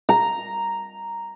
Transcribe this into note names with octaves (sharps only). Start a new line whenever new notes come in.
A#5